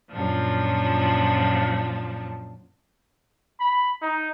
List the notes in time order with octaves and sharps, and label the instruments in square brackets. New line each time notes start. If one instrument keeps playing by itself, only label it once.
[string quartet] F#2 A#2 F3 D4
[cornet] B5
D#4